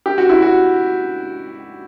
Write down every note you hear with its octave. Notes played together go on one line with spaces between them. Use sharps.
G4
F#4
E4
F#4